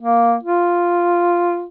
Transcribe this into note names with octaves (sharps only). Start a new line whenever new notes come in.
A#3
F4